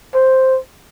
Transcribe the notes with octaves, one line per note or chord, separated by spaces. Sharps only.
C5